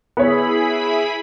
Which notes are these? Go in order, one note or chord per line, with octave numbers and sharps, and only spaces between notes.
B3 E4 G#4 C#5 B5